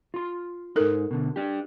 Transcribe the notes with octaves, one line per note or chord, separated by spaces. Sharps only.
F4 C6
G#2 D#4 A4 A#4
B2 D3
D4 G4